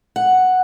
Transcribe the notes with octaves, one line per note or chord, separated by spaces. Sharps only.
F#5